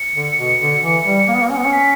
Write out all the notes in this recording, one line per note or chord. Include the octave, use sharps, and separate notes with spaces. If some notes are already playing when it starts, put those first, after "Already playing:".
Already playing: C#7
D3
B2
D3
E3
G3
A#3
B3
A#3
C#4
B3
C#4
B6